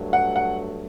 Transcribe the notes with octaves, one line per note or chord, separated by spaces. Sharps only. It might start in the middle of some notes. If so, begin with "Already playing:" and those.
Already playing: G2 F#3 A3
F#5
F#5